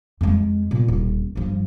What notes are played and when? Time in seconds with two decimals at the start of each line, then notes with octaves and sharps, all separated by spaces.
0.21 F2 G#3
0.71 A#2
0.88 D#1
1.36 G2 F3